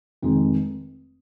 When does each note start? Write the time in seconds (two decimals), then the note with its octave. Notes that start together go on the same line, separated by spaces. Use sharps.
0.22 F1 F2 D#3 G#3